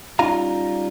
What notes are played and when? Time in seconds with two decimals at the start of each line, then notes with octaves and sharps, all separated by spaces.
0.19 G3 C#4 D#4 F4 F5 A#5